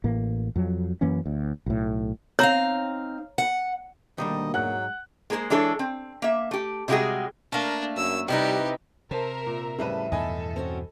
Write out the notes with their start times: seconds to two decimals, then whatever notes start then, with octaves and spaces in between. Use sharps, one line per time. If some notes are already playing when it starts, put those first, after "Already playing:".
0.04 A1 A2 A#3
0.56 F2 F#3
1.01 F#2 E3 A#3 C#4
1.26 D2
1.66 B1 A2
2.39 C4 D#4 C#5 F5 A#5
3.38 F#5
4.18 D2 B2 D#3 G3 A#3 D4 D#5
4.54 G#2 F#3 F#5 F#6
5.30 G#3 A#3 G#4 A4 C5
5.50 E3 G#3 D4 G#4 A4 C#5
5.79 C4
6.22 A#3 E5
6.51 A3 G4
6.88 C3 G3 G#3 B3 F#4 G#4
7.52 A3 A#3 D4
7.97 F#2 E6
8.28 C3 G3 D#4 E4 G4 B4
9.11 C3 A#4 C5 E5 A5 A#5
9.46 A#2
9.78 F2 A2 C#3 G3 B4 E5
10.12 E2 G2 B2 A4 D#5 G#5 B5
10.56 C4 C#4 F#4